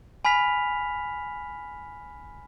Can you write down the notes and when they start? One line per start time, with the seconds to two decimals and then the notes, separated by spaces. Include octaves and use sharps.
0.25 G#5 B5 F6 B6 F7